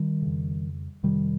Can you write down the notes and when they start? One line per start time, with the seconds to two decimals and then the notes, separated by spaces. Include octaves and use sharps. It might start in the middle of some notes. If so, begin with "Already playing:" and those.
Already playing: D#3 G3
0.22 F2 C#3
1.03 F2 C3 D#3 G3